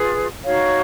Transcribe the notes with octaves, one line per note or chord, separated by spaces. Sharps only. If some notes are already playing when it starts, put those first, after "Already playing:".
Already playing: F4 G#4 B4
D#4 F#4 C#5 F5